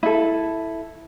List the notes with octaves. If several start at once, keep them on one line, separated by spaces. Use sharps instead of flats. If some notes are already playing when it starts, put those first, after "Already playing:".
E4 A4